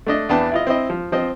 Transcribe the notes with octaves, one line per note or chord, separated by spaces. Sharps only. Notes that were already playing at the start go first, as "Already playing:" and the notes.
A3 D4 D#5
E2 D4 B4 G5 A5
E4 F4 D#5
C4 E4 D#5
F3
F3 C4 D#5